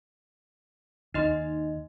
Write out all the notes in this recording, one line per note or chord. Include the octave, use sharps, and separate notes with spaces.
D#2 D#4 D#5 C6